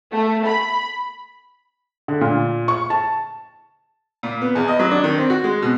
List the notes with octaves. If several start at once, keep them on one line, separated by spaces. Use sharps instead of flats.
A3
B5
D3
A#2
C#6
A5
A#2
B3
E2
D#5
F#3
D4
D#3
C4
F#4
G#3
B2